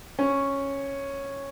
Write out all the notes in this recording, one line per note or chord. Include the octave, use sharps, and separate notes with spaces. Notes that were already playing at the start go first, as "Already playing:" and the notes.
C#4